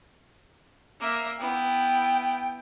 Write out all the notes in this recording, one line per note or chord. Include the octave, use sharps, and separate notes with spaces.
A#3 E5
B3 E4 G5